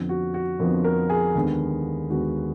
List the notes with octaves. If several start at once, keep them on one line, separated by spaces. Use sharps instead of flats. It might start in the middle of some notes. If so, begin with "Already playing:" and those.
Already playing: F2 D3 F3 B3
F#4
F#4
F2 D3 F3 B3 A#4
A#4
G#4
D#2 D3 G#3 B3
D#2 D3 G#3 B3 F#4